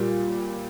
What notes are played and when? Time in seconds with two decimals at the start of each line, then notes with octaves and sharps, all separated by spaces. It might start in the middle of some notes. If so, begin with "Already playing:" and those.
Already playing: A#2 G3